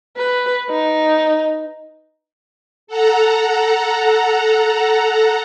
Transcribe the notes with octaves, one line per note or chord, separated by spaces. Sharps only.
B4
D#4
A4 F#5 A#5